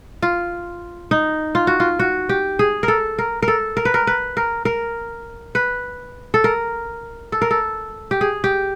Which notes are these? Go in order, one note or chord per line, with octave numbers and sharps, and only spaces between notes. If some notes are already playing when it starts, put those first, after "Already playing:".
F4
D#4
F4
F#4
F4
F#4
G4
G#4
A#4
A4
A#4
A#4
A4
A#4
B4
A#4
B4
A#4
A#4
B4
A4
A#4
A4
A#4
A4
G4
G#4
G4